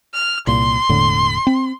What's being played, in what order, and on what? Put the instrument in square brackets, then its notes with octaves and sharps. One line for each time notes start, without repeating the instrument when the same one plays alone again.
[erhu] F6
[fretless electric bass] C2 A#2 [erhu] C6
[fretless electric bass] E1 A2 D3
C4